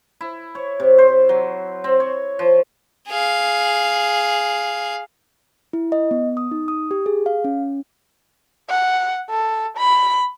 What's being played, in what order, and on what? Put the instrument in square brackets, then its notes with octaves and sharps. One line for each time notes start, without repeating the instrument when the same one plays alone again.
[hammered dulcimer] E4
C#5
C3
C5
F#3
C4
C#5
F3
[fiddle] G#4 F5
[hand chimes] E4
D#5
B3
D#6
D#4
D#6
G4
G#4
F5
C#4
[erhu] F#5
A4
B5